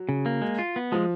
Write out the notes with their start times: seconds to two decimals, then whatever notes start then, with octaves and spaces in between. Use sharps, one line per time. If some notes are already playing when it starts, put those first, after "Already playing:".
Already playing: F#3
0.09 C#3
0.26 A#3
0.42 G#3
0.59 F4
0.76 B3
0.92 F3 G#3